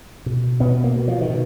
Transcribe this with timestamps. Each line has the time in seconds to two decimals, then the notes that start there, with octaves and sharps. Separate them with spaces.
0.26 B2
0.60 B2 B3
0.84 A#3
0.96 B2
1.08 F3
1.21 D#3
1.30 B2